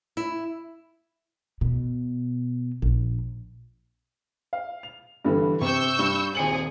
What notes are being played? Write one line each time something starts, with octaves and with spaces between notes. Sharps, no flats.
E4
B2
A#1
F5
F7
G2 D3 E3
C3 C#6 E6 G6
G2
D#1 C4 G#4 C#7 F#7